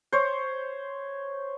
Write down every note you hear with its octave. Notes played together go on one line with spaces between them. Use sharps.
C5 C#5